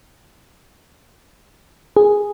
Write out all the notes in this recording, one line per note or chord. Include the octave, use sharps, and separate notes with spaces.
G#4